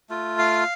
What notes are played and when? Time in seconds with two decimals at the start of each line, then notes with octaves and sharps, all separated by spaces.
0.09 A3 F4
0.39 F5